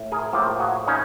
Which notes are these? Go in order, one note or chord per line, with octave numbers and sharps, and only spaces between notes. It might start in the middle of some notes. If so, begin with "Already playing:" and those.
Already playing: A2
G#4 A#4
A2 F3 A#3 G4 A4
F#4 G#4
C#4 D#4